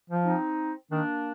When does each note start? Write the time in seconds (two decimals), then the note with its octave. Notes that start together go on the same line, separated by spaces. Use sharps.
0.10 F3
0.25 C4 D#4
0.92 D#3 A#3 D4